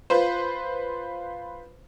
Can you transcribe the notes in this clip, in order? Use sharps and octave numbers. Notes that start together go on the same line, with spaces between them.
F4 B4 C5